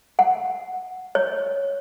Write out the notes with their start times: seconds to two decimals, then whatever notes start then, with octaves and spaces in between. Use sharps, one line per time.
0.19 F#5
1.15 C#5